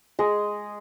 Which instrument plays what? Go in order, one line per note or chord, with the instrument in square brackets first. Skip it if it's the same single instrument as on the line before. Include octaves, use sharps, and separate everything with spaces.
[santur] G#3 G#4 D#5